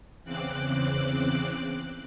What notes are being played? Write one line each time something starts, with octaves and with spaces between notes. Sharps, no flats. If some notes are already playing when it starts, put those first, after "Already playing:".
E2 C#3 C4 D6 F#6